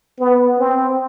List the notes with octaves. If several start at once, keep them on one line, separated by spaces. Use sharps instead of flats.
B3
C4